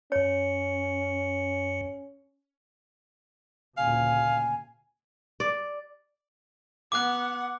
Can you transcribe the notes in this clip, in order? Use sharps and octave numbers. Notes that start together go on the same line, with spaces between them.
F#2 C#4 C#5 C#7
D2 A#2 C#3 F5 G#5
D5
B3 F#5 D6 F#6